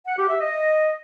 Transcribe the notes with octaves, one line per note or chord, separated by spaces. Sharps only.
F#5
G4
E5
D#5